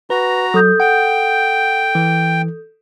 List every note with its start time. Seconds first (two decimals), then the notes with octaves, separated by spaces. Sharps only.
0.10 F#4 B4 A#5
0.54 F#3 A4 D#6 G6
0.80 F#5 G5
1.95 E3